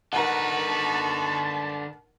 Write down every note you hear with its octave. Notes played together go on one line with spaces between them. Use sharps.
D3 D#4 F#4 A#4 B4 F#5 A5